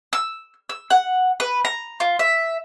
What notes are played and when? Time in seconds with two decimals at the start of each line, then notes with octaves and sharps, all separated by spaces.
0.13 E6
0.69 E6
0.90 F#5
1.40 B4
1.65 A#5
2.00 F4
2.19 E5